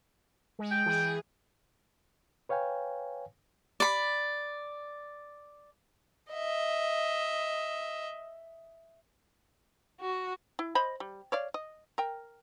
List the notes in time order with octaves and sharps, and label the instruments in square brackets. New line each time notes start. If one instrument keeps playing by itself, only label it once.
[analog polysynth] G#3
[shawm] G5
[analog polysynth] E3 G#4
[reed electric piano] B4 C#5 F5 G5 G#5
[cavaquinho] D5 B5
[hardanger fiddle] D#5 E5
[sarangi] F#4
[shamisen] E4
C5 D#5 B5
G3
C#5 D5 F5
D#5
A#4 G5